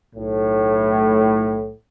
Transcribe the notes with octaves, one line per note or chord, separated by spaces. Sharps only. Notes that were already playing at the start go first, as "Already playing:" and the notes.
B1 A2